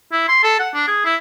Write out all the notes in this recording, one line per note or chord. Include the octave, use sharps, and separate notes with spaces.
E4
C6
A4
F#5
D4
G#4
E4